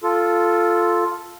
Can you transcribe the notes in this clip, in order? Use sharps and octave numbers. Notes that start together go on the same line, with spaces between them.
F4 A4